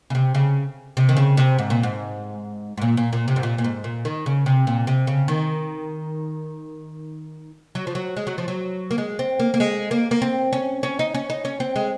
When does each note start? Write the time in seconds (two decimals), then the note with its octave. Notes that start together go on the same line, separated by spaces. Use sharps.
0.10 C#3
0.15 C3
0.35 C#3
0.97 C3
1.09 D#3
1.17 C#3
1.37 C3
1.59 G#2
1.70 A#2
1.83 G#2
2.77 G#2
2.82 A#2
2.97 A#2
3.13 A#2
3.28 C3
3.36 G#2
3.43 A#2
3.58 A#2
3.64 G#2
3.84 A#2
4.05 D#3
4.26 C#3
4.46 C3
4.67 A#2
4.87 C3
5.07 C#3
5.28 D#3
7.75 F#3
7.87 F3
7.95 F#3
8.17 G#3
8.27 F#3
8.38 F3
8.48 F#3
8.91 A#3
8.98 G#3
9.19 C4
9.39 A#3
9.54 A#3
9.60 G#3
9.91 A#3
10.11 A#3
10.22 C4
10.53 C#4
10.83 C#4
10.99 D#4
11.14 C#4
11.30 D#4
11.45 C#4
11.60 C4
11.76 G#3